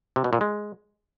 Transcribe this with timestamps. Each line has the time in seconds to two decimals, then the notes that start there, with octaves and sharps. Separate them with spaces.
0.16 C3
0.24 B2
0.33 A#2
0.41 G#3